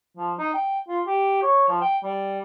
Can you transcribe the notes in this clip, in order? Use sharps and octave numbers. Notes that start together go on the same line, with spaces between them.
F3
D#4
G5
F4
G4
C#5
F3
G5
G3